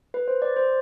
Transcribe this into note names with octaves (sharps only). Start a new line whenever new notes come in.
B4
C5
D5
C5